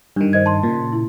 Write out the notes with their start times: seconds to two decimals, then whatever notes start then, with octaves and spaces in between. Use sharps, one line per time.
0.16 G2 D#3 D4
0.33 C5 D#5 G#6
0.46 A5 C6
0.63 A#2 C#3
0.92 E4